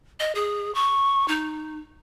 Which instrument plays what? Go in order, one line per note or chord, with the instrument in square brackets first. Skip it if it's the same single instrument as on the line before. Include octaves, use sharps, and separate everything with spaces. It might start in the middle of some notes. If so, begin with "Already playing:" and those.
[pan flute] D#5
G#4
C#6
D#4